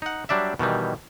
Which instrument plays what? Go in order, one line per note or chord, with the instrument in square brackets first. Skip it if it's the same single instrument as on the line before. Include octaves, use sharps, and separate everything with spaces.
[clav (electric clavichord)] D#4 F#5
F#3 G3 D4 D5 E5
B2 D#3 E3 G3